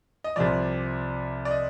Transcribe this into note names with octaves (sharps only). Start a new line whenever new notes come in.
D#5
C2 C3 F3 D5
D5
D#5